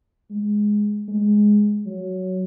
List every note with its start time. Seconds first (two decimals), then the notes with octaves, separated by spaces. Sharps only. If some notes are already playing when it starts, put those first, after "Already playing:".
0.30 G#3
1.08 G#3
1.86 F#3